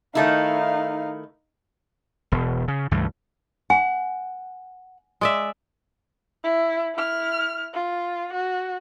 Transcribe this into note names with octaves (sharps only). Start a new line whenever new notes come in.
D#3 A3 D#4 E4 F5
E1 B2
C#3
C#2 G2 E3 A3
F#5 G#5
G#3 D5 E5
E4
E4 F6
F4
F#4